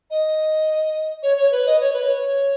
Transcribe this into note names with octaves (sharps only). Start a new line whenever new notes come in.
D#5
C#5
C#5
B4
D#5
C#5
B4
C#5